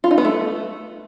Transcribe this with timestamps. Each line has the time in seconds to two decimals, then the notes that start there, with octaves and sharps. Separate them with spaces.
0.04 F4
0.11 D#4
0.18 B3
0.25 A3